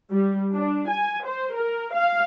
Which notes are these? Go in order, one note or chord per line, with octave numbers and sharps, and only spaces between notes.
G3
D4
G#5
C5
A#4
F5